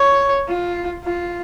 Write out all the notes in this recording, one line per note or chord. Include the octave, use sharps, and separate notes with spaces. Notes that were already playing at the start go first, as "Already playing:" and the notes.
Already playing: C#5
F4
F4